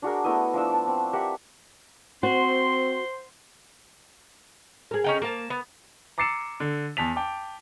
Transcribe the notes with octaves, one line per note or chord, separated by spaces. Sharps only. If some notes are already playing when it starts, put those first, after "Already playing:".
D4 F#4 G#4 A#4
A3 B3 E4 D#5
F3 D4 E6
A5 D6
C4
G4 A#4 E5 F#5
C4 F#4 C5 C6
G#4 A#4
C#4 D#4 G5
A#3 A#4 A5
B3
A#5 D6 A6 C7 C#7 E7
D3
E2 A5 B6 F7
G5 A5 D6